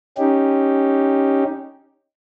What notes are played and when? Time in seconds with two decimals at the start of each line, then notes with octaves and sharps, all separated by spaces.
0.18 C#4 D#4 G4